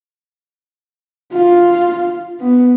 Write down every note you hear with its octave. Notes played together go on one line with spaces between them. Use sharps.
F4
B3